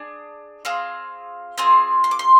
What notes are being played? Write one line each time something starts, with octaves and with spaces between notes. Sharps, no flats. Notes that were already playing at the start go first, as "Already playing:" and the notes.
Already playing: D4 G#4
C4 F4 G#4
C4 F4 G#4 D#6
C6
D6
C6